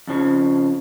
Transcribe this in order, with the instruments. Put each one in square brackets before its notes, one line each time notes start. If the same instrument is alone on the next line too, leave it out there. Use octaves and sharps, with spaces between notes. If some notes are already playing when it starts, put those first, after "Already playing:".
[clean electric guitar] F2 C#3 F3